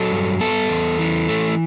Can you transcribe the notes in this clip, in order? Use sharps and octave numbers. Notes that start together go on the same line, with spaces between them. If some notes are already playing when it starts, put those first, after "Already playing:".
Already playing: F#3 A4
G2
B3 A4
E2
E3
A3